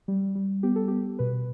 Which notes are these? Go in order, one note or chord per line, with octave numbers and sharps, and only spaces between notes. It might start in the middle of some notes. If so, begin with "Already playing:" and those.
G3
G3
B3 G4
A4
B3 G4
B2 B4